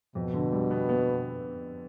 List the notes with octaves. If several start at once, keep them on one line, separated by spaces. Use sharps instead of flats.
F2 B2
D3
G3
B3
B3